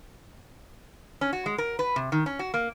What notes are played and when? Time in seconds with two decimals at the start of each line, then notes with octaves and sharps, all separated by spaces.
1.21 C#4
1.33 F#4
1.46 G#3
1.58 A#4
1.79 B4
1.96 C3
2.12 D#3
2.26 C#4
2.39 F#4
2.54 A#3